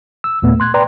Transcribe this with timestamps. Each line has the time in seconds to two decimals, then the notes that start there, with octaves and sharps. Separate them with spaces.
0.24 E6
0.42 D#2 A#2 A3 B3
0.60 C6 F#6 G#6
0.74 B4 D5 G5 A#5 C6